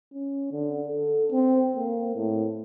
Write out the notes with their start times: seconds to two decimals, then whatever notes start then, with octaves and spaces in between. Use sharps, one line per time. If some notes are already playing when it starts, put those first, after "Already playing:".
0.14 C#4
0.52 D3
0.88 A4
1.31 C4
1.77 A#3
2.16 A2